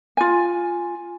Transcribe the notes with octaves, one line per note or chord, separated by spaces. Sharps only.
F4 G#5